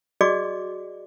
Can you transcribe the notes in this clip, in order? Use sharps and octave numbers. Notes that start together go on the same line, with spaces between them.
F#4 G#4 D5 D#5 D6